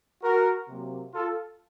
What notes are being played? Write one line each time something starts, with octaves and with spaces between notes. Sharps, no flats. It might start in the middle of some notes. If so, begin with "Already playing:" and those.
F#4 A#4
C3 F#3 A#3
F4 A4